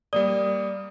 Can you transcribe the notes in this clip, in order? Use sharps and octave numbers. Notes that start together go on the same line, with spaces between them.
G3 A#3 D5 D#6